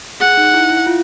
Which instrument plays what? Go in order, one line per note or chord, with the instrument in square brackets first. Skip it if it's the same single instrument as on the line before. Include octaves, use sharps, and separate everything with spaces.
[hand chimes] G#4 [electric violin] F#5
[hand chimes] D#4
E4
E4
F4